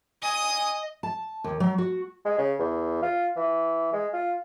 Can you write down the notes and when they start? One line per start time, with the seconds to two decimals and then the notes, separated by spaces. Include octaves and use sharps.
0.23 D#5 G#5 D#6
1.03 A5
1.44 D#2
1.60 F#3
1.78 F#4
2.25 G#3
2.38 C#3
2.59 E2
3.02 F4
3.36 E3
3.93 G#3
4.13 F4